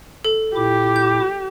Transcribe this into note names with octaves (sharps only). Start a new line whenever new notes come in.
A4
A#2 E4 G4 D6
G6